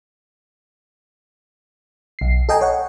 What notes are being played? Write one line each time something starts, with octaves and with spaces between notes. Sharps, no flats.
B1 C7
A4 D#5 G5 G#5 A#5
C#5 F#5